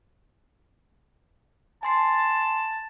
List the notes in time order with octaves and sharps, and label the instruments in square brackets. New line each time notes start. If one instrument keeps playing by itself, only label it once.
[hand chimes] G#5 C6 C7 [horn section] A5